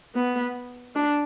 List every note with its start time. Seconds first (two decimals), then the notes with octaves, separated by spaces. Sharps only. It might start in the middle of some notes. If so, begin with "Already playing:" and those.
0.15 B3
0.95 D4